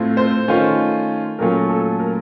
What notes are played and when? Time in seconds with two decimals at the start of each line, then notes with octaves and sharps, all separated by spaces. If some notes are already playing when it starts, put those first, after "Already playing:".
Already playing: A2 A3 C4 F4
0.17 C5
0.48 D#3 A3 C#4 F4
1.39 A#2 F#3 A3 C#4 F4 A#4
1.69 A4
2.00 A#4